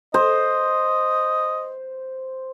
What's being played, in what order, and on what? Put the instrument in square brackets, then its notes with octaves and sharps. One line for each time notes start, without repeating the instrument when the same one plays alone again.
[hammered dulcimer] C5 [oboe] D#5